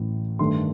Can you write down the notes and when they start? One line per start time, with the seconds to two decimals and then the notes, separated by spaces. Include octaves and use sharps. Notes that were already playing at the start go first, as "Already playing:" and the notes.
Already playing: A1 A2
0.39 G2 D#3 A3 C6